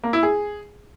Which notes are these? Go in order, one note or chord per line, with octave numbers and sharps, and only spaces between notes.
A#3
E4
G#4